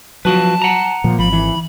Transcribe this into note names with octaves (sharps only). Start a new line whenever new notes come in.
F3 F#3 F#4 B4 A5
F#5 A#5
A#2 F3
G#1 F3 B5
E3